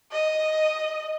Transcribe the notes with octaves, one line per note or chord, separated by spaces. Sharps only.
D#5